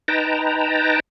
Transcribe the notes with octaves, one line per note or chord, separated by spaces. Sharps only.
D#4 B4 G5 A5 A#5